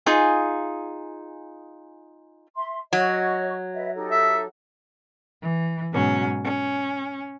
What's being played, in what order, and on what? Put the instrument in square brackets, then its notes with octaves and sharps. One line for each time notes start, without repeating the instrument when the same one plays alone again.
[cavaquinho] D#4 F4 G#4 G#5
[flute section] E5 C6
[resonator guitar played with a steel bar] F#3 [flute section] C#5 D#5 C#6
[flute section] B4 D#5 E5
D#4 G4 A4
[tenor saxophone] E5
[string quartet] E3
G#2 B2 F#3 C#4
C#4